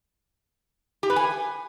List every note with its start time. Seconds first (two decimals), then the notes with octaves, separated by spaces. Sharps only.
1.03 G4
1.10 B4
1.16 G#5